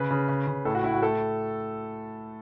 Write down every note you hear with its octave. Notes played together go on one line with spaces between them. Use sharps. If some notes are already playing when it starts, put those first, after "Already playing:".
Already playing: C#3 B4
C#3
C#3
C#3
A2 A4
F#4
A2 E4
F#4
A3 A4